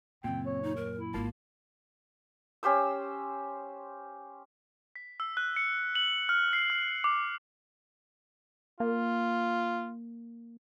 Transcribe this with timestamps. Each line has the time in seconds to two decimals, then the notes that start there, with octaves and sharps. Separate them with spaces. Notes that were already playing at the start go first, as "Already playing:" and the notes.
0.24 F#2 A#2 C#3 C4 G5
0.46 C#5
0.63 D#4
0.76 D#2 A#4
0.97 E4
1.14 G#1 G#3 A#3 F4 A#4 A5
2.63 C#4 G4 C5 E6
4.96 B6
5.20 E6
5.37 F#6
5.56 C#7
5.95 F#7
6.29 F6
6.53 C7
6.70 F6
7.04 D6
8.80 A#3 F4